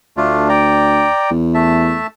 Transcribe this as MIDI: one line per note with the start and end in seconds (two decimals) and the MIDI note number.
0.17 1.09 38
0.17 0.49 57
0.17 0.49 62
0.17 0.49 65
0.49 1.30 74
0.49 1.30 79
0.49 1.30 82
1.31 1.98 40
1.54 2.07 57
1.54 2.07 76
1.54 2.07 81